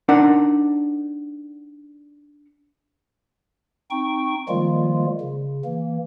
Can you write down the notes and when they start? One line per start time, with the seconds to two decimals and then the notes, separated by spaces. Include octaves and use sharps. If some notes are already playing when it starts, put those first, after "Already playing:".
0.09 D4 D#4 A#4 F#5
3.91 C4 D#4 G5 C#6
4.49 D#3 F3 G3 G#3 A#3 F4
5.21 C#3
5.64 E3 A#3